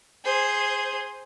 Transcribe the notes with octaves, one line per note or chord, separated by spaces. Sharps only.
G#4 C5